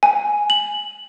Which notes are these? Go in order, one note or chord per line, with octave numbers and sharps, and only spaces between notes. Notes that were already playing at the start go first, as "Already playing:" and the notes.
G#5
F#7